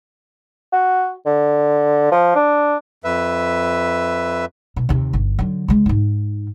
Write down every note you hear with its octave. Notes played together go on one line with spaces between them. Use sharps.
F#4
D3
F3
D4
F2 B4 E5
B2
D#2 C3
G1
D3 F#3
C#3 G#3
G#2 D#4